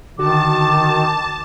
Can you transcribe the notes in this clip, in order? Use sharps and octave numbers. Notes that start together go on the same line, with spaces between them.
D3 D#3 F#4 A5 D6